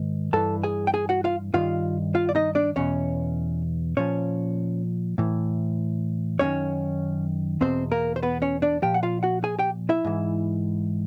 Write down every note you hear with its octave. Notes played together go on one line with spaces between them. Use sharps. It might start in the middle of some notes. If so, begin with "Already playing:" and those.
Already playing: G#2 D#3
G2 E3 A4 A5
G#4 G#5
G5
G#4 G#5
F#4 F#5
F4 F5
G2 D#3 F4 F5
F4 F5
D5
D#4 D#5
D4 D5
E2 B2 C#4 C#5
A#2 F3 C#4 C#5
A2 E3
F#2 D#3 C#4 C#5
E2 B2 C4 C5
A#3 A#4
C5
B3 B4
C#4 C#5
D4 D5
A#2 F3 G4 G5
F#5
F4 F5
F#4 F#5
G#4 G#5
G4 G5
E4 E5
G#2 E3